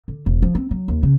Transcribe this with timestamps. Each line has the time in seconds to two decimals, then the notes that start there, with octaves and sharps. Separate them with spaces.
0.08 D3
0.26 E1
0.42 F3
0.55 C4
0.71 F#3
0.88 D#2
1.03 C#3